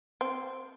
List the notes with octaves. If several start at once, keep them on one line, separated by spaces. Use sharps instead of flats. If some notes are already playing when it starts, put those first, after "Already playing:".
C4